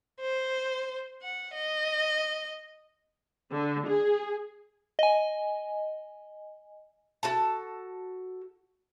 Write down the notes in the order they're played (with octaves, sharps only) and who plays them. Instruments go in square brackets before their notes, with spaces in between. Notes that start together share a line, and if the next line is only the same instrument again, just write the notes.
[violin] C5
F#5
D#5
[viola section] D3
G#4
[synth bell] D#5 G#5
[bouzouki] F#4 A4 A5